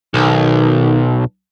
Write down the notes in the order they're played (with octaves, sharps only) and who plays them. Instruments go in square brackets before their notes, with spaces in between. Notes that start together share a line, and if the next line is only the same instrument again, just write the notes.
[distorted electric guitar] B1 [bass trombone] D#3